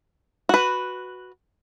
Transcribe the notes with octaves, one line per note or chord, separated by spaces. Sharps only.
F#4 B4